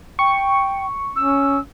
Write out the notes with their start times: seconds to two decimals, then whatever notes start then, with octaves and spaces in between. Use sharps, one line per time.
0.19 G5 C#6
1.16 C#4 E6